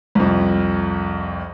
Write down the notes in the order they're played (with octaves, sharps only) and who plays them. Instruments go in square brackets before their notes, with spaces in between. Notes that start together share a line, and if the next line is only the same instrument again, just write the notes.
[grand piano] C2 F2